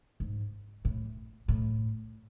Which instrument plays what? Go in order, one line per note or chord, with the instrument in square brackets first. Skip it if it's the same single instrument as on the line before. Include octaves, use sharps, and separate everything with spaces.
[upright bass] G#2
A2
A2